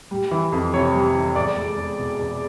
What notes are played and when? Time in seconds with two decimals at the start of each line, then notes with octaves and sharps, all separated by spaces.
0.11 G3
0.31 E3
0.52 F2
0.74 C3 C#5
0.94 G3
1.15 E3
1.36 E2 D5
1.57 G#3
1.77 E2
1.99 B2
2.19 E2